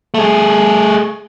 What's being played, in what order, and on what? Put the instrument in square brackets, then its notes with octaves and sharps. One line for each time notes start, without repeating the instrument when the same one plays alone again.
[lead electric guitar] A3 G#4